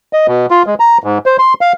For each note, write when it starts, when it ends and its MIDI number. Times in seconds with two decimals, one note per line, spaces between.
0.13 0.27 75
0.28 0.46 47
0.51 0.63 65
0.66 0.74 56
0.80 0.98 82
1.04 1.18 44
1.26 1.37 72
1.39 1.54 84
1.61 1.73 77